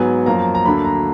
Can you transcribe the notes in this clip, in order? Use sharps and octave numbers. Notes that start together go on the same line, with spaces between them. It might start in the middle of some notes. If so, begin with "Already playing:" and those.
Already playing: G#2 F#3 B3 G#5
F#2 F3 A#3 A#5
A#5
D2 D3 F#3 A#3 B5
A#5